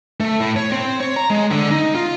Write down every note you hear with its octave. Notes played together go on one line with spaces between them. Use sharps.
A3
A2
C#5
C4
C#5
A#5
G#3
D3
D#4
F4